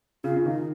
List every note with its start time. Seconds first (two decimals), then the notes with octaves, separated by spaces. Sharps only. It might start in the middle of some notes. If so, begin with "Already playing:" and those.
0.24 C#3 F4
0.36 C#3
0.46 D#3 D#4